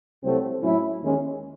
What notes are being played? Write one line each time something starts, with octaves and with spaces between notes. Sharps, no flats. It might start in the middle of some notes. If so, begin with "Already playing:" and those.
C2 C3 F#3 A3 C4
A2 F#3 C#4 E4
D#2 D#3 G#3 C#4